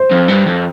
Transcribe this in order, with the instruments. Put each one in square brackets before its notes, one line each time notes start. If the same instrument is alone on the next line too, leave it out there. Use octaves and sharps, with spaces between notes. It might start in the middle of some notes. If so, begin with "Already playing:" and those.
Already playing: [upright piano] C5
[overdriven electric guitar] F2
G2
F2